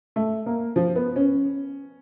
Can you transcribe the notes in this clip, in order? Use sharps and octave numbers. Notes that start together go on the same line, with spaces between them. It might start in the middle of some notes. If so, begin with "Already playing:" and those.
A3
A#3
F3
B3
C#4